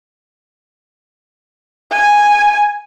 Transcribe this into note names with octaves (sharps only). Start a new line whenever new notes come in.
G#5